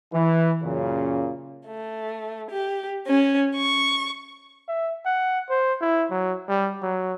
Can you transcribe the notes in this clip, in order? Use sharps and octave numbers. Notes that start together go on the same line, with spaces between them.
E3
F#2 A#2 C#3
A3
G4
C#4
C#6
E5
F#5
C5
E4
F#3
G3
F#3